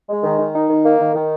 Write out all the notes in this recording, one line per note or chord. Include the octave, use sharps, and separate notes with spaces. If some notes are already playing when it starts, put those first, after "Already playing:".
G#3
D#3
D#3
D#4
D#3
A#3
D#3
D#3